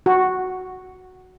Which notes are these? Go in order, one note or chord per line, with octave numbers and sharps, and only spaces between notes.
F#4